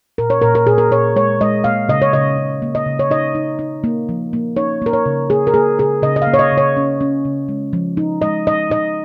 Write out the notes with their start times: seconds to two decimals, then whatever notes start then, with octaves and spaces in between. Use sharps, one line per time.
0.18 A#2 A#4
0.30 C#5
0.42 A#2 A#4
0.55 A#4
0.67 A#2 G#4
0.78 A#4
0.91 A#2 C#5
1.16 G#3 C#5
1.41 G#3 D#5
1.64 A#3 F5
1.89 C#3 D#5
2.02 C#5
2.13 C#3 D#5
2.38 C#3
2.62 A#3
2.75 D#5
2.86 C#3
2.99 C#5
3.11 D#4 D#5
3.35 D#4
3.59 D#4
3.84 A#3
4.09 F3
4.33 A#3
4.57 D#4 C#5
4.82 A#3 A#4
4.93 C#5
5.06 C#3
5.30 A#3 G#4
5.47 A#4
5.54 A#3 G#4
5.78 C#3 G#4
6.02 C#3 D#5
6.16 D#5
6.22 F5
6.27 A#3
6.34 C#5
6.39 D#5
6.52 C#3
6.58 C#5
6.77 C#4
7.01 C#4
7.25 C#3
7.48 G#3
7.73 F3
7.97 D#4
8.22 G#3 D#5
8.47 D#4 D#5
8.70 D#4 D#5